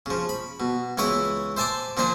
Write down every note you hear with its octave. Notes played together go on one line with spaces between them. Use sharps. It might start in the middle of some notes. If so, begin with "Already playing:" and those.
C#3 F3
B5
B2
C#2 E3 E4 C#5 B5 D#6
C5 E5 G#5 A5 C6 D6
A#2 F3 D4 C5 G#5